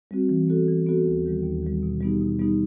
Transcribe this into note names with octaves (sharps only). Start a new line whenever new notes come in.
G3 C4 F#4
E3
B3 F#4 A4
E3
B3 F#4 A4
D#2
D#3 G3
D#2
D#3 G3
B2
G3 B3 D#4 G4
B2
G3 B3 D#4 G4